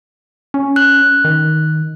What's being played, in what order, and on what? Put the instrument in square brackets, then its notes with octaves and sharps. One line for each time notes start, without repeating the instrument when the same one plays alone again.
[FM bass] C#4
[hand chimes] F#6
[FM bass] D#3